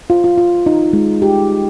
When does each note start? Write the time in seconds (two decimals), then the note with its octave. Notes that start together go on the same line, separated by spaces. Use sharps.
0.10 F4
0.24 F4
0.38 F4
0.66 D#4
0.93 G#3
1.22 G4